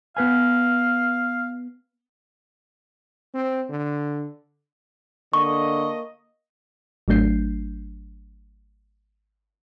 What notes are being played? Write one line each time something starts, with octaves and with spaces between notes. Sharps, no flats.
B3 B4 F5 G#5
C4
D3
D3 A#3 D#5 C#6
G#1 F#3 A3 D4 G6 C7